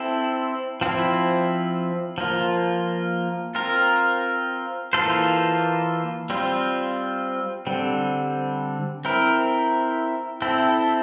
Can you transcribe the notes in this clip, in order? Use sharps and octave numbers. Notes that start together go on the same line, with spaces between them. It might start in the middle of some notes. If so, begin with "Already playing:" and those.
Already playing: C4 E4 A4 C5
F3 C4 E4
F3 A#3 F4
C4 F4 A#4
E3 A#3 F4 A4 C5
G3 C4 F4
D3 G3 C4
C4 E4 A#4
C4 E4 A4